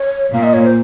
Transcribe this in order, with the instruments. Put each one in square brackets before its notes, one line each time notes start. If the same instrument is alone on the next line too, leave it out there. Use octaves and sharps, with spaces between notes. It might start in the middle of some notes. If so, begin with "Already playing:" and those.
Already playing: [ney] C#5
[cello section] A#2 A#3 [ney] F5
[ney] D#5
C#5
C5